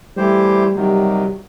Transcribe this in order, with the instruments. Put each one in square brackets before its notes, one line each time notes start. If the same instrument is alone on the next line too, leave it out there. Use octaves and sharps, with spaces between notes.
[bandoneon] E3 A3 E4 G4 C5 [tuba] G3
[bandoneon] C3 D#3 F#3 [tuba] G3